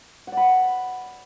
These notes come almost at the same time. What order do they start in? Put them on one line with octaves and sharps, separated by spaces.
F#5 D5 B5